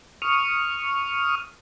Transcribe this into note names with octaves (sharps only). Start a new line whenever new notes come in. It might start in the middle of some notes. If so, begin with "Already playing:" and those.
C#6 D#6 F6